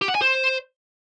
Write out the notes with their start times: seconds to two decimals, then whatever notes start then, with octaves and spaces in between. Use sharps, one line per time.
0.02 G4
0.08 F#5
0.15 G#5
0.22 C5